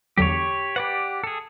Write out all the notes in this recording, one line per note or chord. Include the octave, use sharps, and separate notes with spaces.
E2 D3 F#3 G4 C#5
G4 B4 D5 F#5
G#4 A4